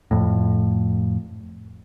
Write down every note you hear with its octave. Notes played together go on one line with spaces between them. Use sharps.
F2 A2